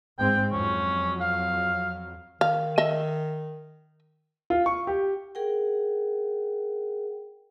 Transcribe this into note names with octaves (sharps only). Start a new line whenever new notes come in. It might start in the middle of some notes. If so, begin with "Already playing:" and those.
G#2 C4 G5
F2 F#3 C#4
F5
D#3 F5
D#5 E5
F4
C#6
G4
G#4 A#4 F#5 G5